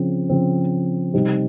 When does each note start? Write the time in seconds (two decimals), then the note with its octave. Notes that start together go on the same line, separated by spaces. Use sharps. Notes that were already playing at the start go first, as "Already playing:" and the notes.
Already playing: C#3 F3 C4
0.29 C#3 F3 C4
1.13 C3 G3 C4 D#4